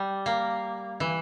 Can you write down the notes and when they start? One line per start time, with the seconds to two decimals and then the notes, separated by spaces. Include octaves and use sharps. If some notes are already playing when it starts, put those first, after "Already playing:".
Already playing: G3
0.26 A#3
1.00 E3